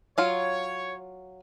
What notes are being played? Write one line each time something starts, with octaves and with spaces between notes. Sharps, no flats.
F#3 F4 C#5